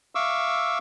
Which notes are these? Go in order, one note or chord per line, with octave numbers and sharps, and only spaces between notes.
E5 F5 C#6 D6 E6